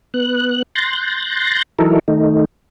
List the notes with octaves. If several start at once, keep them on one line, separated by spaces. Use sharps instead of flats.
B3 F#6
C6 F#6 G6 A6 A#6
E3 F#3 D#4 E4 A4 A#4
D#3 A3 D#4